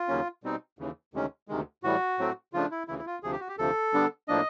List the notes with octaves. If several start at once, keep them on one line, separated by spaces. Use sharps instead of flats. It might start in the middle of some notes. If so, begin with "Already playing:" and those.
Already playing: F4
D#2 C#3 F#3 A#3 C#4
B2 G3 C4 D#4
D#2 C#3 E3
D2 C3 D#3 G#3 C#4
D2 C3 D#3 G#3
A2 E3 G3 F#4
A2 F#3 A3 C4
C#3 F3 A3 D4 F4
E4
D2 C#3 E3 E4
E4
F4
D2 C3 F3 G#4
G4
F#4
G4
D2 C3 F3 A4
D3 G3 B3 D4
A2 F3 A#3 D4 D#5